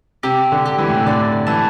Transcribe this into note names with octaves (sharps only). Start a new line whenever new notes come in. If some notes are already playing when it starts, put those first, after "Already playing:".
C3 G4
D3
G4
E3
A2
C3
D3 D5
E3 A5